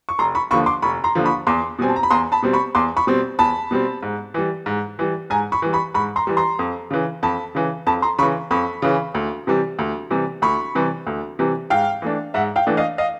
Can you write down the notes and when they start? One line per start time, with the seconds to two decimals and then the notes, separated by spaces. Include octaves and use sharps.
0.09 C#6
0.19 F1 A#5 C6
0.35 B5 C#6
0.51 D#2 D3 F3 B5 C#6
0.66 C6 D6
0.82 F1 B5 C#6
1.04 A#5 C6
1.15 D#2 D3 F3
1.26 B5 C#6
1.47 E2 C6 D6
1.79 B2 G3 C4 G#5
1.89 A5
1.96 A#5
2.03 B5
2.11 E2 A#5 C6
2.32 A5 B5
2.42 B2 G3 C4
2.53 B5 C#6
2.75 E2 C6 D6
2.97 B5 C#6
3.07 B2 G3 C4
3.39 E2 A5 B5
3.71 B2 G3 C4
4.03 G#2
4.34 E3 G3
4.66 G#2
4.99 E3 G3
5.30 G#2 G#5 A#5
5.52 B5 C#6
5.62 E3 G3
5.73 B5 C#6
5.94 G#2 B5 C#6
6.16 A#5 C6
6.27 E3 G3
6.37 A#5 C6
6.59 F2
6.91 C#3 E3
7.23 F2 A5 B5
7.55 C#3 E3
7.86 F2 A5 B5
8.02 A#5 C6
8.19 C#3 B5 C#6
8.23 E3
8.51 F2 B5 C#6
8.82 C#3 E3
9.15 D2
9.47 C3 E3 G3
9.79 D2
10.11 C3 E3 G3
10.42 D2 B5 C#6
10.75 C3 E3 G3
11.07 D2
11.39 C3 E3 G3
11.70 G#2 F5 G5
12.02 E3 A3 D4
12.34 G#2 E5 F#5
12.56 F5 G5
12.67 E3 A3 D4
12.77 D#5 F5
12.98 D#5 F5